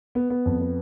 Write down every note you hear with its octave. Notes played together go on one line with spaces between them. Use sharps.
B3
B3
F2
B3